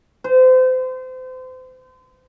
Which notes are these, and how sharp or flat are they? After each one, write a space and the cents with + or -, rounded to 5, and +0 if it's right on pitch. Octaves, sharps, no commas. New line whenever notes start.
C5 -35